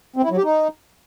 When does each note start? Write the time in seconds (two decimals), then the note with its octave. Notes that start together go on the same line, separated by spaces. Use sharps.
0.16 C4
0.23 E4
0.30 F#3
0.37 G4
0.44 D#4